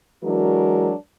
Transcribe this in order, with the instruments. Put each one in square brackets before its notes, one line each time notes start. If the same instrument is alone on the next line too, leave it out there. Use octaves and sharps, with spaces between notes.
[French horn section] E3 F#3 G#3 D4 F#4 A#4